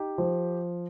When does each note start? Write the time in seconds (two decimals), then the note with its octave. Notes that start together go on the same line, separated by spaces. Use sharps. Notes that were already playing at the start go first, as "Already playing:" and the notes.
Already playing: D#4 G4
0.18 F3